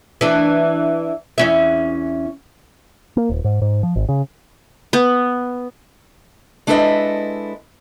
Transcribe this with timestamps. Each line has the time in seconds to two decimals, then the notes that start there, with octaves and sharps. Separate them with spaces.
0.21 E3 D4
1.38 E2 C#4 E5
3.17 A#3
3.30 D#1
3.44 G#2
3.62 G#2
3.83 F3
3.96 G#1
4.09 C#3
4.93 B3
6.67 G#3 D4 E4 A4 B4 D#5